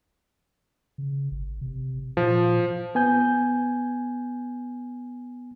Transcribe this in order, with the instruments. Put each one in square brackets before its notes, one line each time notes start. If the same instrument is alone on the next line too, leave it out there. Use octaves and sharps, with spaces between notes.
[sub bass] C#3
G#1
C3
[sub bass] A#2 [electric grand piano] F3
[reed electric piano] B3 G#5 G6